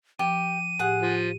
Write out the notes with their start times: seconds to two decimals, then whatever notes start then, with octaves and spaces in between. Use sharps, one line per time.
0.19 F3 G4 G5 D#7
0.79 A2 G4 G#4 F#5
1.02 F3